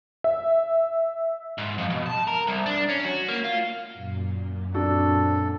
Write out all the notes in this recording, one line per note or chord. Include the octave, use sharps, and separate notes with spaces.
E5
G#2
F2
B2
A5
A#4
C2
D4
C#4
F#4
A#3
F4
F#2 A#2
C4 D4 F#4 A4